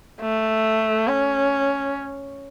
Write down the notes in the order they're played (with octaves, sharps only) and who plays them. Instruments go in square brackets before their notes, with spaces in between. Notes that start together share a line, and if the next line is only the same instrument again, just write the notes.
[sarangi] A3
C#4